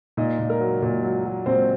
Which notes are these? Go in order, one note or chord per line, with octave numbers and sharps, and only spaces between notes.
A#2 D#4 D#5
A#2
A#4
F#3
A#2 A#4
F#3
F#3
A#2 C4 C5